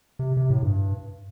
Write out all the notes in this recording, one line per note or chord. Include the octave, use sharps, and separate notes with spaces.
C3
C3
A2
G2